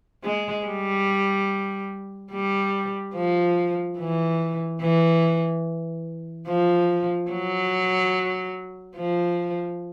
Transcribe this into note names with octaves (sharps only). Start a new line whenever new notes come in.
G#3
G3
G3
F3
E3
E3
F3
F#3
F3